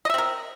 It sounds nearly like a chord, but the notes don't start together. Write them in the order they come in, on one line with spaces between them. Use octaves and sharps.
D#5 E5 C4 A#4